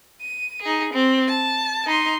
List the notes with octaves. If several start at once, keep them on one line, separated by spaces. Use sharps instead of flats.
D#7
D#4 G#4
C4
A5
D#4 C6